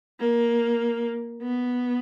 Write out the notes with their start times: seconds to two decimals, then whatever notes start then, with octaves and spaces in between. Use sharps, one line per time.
0.19 A#3
1.42 B3